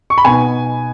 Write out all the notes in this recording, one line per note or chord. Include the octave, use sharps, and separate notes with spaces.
C#6
B5
B2 B3 D#4 G#5